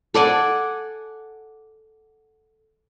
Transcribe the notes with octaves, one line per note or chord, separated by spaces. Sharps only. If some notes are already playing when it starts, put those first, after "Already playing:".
A4 D5 F#5 G#5